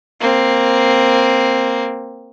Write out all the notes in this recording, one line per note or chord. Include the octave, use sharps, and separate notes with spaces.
A#3 C4